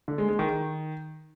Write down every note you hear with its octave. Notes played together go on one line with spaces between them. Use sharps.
D3
G#3
G#3
D#3
D#3